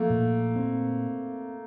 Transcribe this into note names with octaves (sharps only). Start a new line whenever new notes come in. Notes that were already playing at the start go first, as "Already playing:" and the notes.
Already playing: F3 A3 A#3
A#2
C4